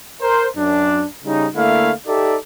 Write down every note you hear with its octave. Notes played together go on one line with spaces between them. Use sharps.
A#4 C5
F#2 D4
C#3 G3 D#4
D3 A3 A#3 E4 F5
D#4 G4 A4 D5 E5